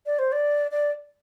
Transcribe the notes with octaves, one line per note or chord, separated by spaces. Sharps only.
D5
C5
D5
D5